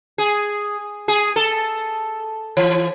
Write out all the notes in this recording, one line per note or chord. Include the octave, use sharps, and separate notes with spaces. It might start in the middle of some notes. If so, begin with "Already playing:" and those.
G#4
G#4
A4
E3